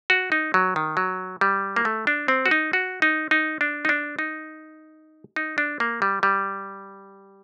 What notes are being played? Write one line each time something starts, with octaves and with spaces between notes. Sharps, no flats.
F#4
D#4
F#3
D#3
F#3
G3
A#3
A3
D4
C4
F#4
D#4
F#4
D#4
D#4
D4
D#4
D4
D#4
D#4
D4
A#3
G3
G3